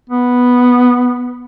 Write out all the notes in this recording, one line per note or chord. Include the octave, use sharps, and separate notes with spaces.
B3